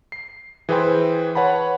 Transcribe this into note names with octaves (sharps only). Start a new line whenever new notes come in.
C7
E3 G#4 B4 C5 G5 C6
B4 C#5 F#5 A5 B5